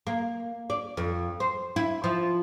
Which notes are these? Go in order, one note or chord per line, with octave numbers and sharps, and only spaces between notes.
A#3
D5
F2
C5
E4
F3